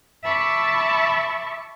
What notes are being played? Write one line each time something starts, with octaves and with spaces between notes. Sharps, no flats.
E5 A5 B5 C#6 D6